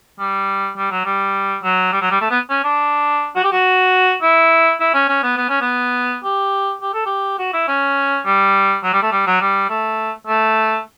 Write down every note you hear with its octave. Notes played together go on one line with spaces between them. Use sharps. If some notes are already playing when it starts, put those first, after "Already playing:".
G3
G3
F#3
G3
F#3
G3
F#3
G3
A3
B3
C#4
D4
F#4
G4
F#4
E4
E4
C#4
C#4
B3
B3
C#4
B3
G4
G4
A4
G4
F#4
E4
C#4
G3
F#3
G3
A3
G3
F#3
G3
A3
A3